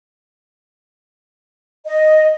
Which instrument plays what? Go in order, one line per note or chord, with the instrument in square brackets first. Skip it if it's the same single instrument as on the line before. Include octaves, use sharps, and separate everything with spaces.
[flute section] D#5